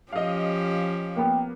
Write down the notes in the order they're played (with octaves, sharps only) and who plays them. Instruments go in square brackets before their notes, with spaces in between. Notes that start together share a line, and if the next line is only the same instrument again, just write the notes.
[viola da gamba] F3 C#4 G4 [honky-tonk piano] D#5 F5
[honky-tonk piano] A#3 B3 [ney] G5